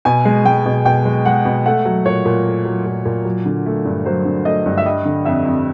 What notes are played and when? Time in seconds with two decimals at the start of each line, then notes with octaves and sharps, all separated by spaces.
0.05 B2 G#5
0.25 G#3
0.45 G#3 G5
0.66 B2
0.85 B2 G5
1.05 G#3
1.25 G#3 F#5
1.45 B2
1.66 A3 F#5
1.85 F#3
2.06 A#2 C#5
2.25 A#2
2.46 A3
2.65 F#3
2.86 A#2
3.05 A#2
3.25 F#3
3.46 D3
3.66 A3
3.85 G2
4.06 F#3 C5
4.25 D3
4.45 A3 D#5
4.66 G2
4.77 E5
4.86 G3 D#5
5.05 D3
5.25 F2 E5
5.45 F2